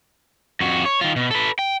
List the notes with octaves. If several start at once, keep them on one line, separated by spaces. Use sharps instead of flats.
F2 F#4
C#5
D#3 F4
B2
A4 B4
G5